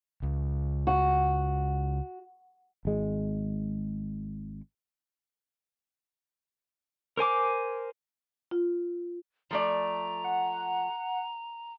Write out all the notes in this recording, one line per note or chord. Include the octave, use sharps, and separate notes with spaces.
C#2
F#4
G#1 G#3
A#4 C5 G#5 D6
F4
F3 A3 D5 A#5
F#5